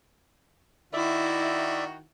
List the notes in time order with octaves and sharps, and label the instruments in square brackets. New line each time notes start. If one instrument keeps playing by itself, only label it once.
[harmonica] D#3 F#4 [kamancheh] E4 [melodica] D5 E5